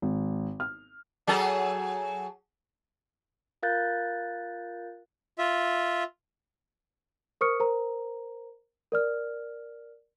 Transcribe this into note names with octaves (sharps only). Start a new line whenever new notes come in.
G#1
F6
F#3 G#4 A4
F4 A#4 F5 F#6 G6 A6
F4 E5
A#4 C5 C#6 D#6 F6 C#7
A#4 C5 A#5
A#4 D5 F6